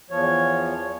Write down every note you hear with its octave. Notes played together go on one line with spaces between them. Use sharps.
E2 F3 C#5